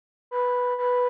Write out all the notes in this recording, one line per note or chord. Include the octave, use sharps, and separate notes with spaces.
B4
B4